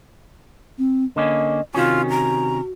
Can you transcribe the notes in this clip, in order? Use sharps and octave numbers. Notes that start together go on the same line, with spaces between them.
C4
D3 A#3 C#4 D#5
C3 D#3 C#4 F4 F#4
A#5